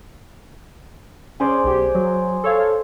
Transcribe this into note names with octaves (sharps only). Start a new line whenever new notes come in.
C#4 G#4 C5 D5
B1 G4
F#3
A4 C#5 F5